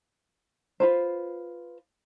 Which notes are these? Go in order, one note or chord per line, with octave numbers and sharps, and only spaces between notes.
F4 B4 C5